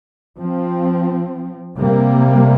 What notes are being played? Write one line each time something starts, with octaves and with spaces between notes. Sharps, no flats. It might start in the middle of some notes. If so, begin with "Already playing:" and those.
F3 C4
C3 G3 A#3